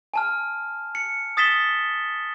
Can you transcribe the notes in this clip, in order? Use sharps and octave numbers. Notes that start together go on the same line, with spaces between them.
G#5 A5 F6
C#7
D#6 A6 B6 E7 G7